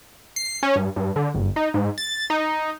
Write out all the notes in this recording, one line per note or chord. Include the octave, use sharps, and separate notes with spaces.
C7
C#4
G2
G2
D3
G1
D#4
G#2
A6
D#4